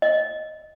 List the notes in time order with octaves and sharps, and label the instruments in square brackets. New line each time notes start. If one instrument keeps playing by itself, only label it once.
[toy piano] D#5